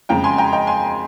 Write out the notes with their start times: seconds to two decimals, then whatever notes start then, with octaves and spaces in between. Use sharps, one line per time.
0.09 F2 C#3 G#3 G5 A#5
0.24 G#5 C6
0.38 G5 A#5
0.52 D#5 G5
0.67 G#5 C6